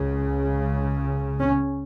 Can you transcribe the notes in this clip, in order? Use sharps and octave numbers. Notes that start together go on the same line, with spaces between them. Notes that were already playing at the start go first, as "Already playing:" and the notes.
Already playing: C#2 C#3
C#4